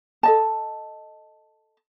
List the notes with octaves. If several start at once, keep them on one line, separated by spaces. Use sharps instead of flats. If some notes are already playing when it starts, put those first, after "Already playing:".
A4 D#5 A5